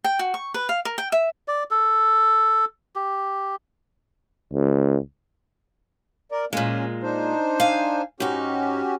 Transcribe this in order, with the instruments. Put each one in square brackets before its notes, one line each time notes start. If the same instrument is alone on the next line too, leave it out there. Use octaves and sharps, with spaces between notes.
[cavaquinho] G5
F#4
C#6
B4
F5
A#4
G5
E5
[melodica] D5
A4
G4
[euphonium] C#2
[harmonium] A#4 D5
[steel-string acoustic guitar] A#2 G#3 [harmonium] A#3 C#4 F4
[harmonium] D4 D#4 C5
[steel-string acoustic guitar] F5 G#5
[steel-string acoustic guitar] G#2 D#4 [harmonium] C#4 F#4 G4